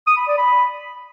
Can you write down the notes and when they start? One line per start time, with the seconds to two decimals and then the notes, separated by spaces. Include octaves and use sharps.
0.07 D#6
0.17 B5
0.27 D5
0.38 B5